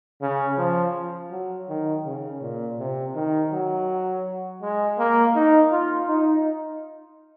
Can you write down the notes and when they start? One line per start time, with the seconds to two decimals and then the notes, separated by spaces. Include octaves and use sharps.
0.21 C#3
0.58 F3
1.31 F#3
1.69 D#3
2.05 C#3
2.42 A#2
2.79 C3
3.15 D#3
3.52 F#3
4.62 G#3
4.99 A#3
5.35 D#4
5.72 F4
6.08 D#4